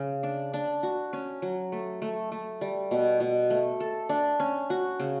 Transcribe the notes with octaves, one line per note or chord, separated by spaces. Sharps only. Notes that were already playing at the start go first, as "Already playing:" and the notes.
Already playing: C#3
D4
D4
F#4
C#4
F#3
A3
A3
A3
G3
B2
B2
A3
A4
D4
C#4
F#4
C#3